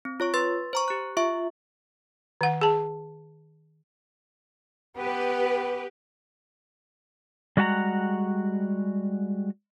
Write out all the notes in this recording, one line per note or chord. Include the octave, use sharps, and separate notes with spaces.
C4
F4 C#5 C#6
B4 C6 A6
C5 A#5 C#6
G4 F#6
F4 E5 C#6
D#3 F#5
G#4 A5
B3 G4 B4
G3 G#3 F#4 F#5 A5 A#5